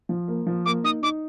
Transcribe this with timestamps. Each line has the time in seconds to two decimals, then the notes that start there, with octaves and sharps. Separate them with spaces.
0.09 F3
0.28 A#3
0.47 F3
0.66 A#3 D6
0.84 D#4 D#6
1.03 D#4 D6